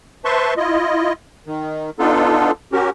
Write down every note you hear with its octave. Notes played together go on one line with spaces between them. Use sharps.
B4 C5 E5 A5 C6 C#6
E4 F4 D#5
D#3
B3 D4 D#4 F4 A4
C#4 F#4 G4 A#4